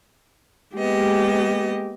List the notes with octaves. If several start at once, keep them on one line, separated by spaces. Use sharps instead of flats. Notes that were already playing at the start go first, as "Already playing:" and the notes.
G#3 A#3 B3 G4 D#5